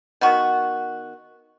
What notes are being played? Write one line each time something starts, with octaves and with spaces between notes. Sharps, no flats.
D#3 B3 F#4